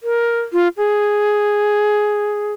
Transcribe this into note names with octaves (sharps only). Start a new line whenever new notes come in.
A#4
F4
G#4